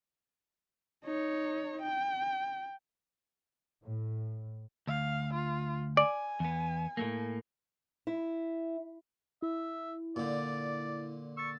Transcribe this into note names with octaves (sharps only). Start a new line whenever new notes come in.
D#4 C#5
G5
A2
D2 F5
F4
D5 G#5
E2 B3
A2 A3 A#3
E4
E4 E5
A#2 D3 D5
C#6 E6 A6